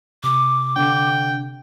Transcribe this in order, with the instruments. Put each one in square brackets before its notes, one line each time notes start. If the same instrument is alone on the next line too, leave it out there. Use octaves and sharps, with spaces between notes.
[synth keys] C3 [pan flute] D6
[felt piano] D3 [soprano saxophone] G5